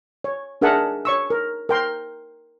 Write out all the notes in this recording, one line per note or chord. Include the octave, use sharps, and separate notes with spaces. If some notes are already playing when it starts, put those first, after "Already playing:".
C#5
D4 G#4 A#4 E5 F#5 A5
C#5 C#6 E6
A#4
A#4 G5 C6